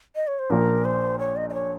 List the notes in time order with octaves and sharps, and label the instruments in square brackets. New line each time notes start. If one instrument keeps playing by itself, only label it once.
[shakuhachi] D#5
C#5
C5
[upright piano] A#1 A#2 F3 [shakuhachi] A#4
[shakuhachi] C5
C#5
D#5
D#5
C#5